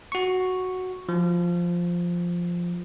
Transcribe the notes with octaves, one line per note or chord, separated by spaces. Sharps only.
F#4 C#6
F3